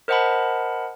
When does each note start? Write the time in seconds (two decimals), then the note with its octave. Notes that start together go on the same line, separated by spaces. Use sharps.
0.08 A#4 C5 D#5 F#5 A5 B5